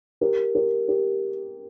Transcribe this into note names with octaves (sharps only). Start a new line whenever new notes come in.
G4 A#4
G4 A#4
G4 A#4